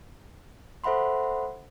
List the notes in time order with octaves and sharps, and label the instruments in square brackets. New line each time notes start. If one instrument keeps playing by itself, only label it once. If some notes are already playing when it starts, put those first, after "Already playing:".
[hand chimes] A4 C5 E5 F#5 B5 C6